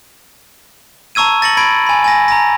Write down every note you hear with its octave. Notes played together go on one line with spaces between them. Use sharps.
A5 A#5 C#6 E6 G#6 D#7
A6 A#6 C#7 F#7
B5 G#6 D7
G#5 B5
G#5 A#6
A#5 A#6